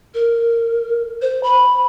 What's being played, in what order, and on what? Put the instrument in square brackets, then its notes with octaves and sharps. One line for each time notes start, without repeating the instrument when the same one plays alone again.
[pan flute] A#4
C5
B5